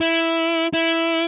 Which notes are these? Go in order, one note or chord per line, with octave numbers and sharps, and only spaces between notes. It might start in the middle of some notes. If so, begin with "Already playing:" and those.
E4
E4